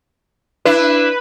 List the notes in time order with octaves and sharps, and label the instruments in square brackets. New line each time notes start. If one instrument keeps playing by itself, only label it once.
[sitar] D4 E4 [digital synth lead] B4